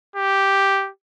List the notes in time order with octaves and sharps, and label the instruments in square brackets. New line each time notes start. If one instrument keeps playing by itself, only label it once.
[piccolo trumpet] G4